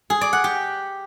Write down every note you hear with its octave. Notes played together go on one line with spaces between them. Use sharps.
G#4
D5
F#5
G4